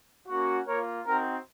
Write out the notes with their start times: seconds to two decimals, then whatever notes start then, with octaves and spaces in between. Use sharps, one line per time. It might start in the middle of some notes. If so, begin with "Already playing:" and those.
0.28 A#3 C#4 F#4
0.67 A#3 F4 A#4 C#5
1.06 C4 D#4 F#4 A#4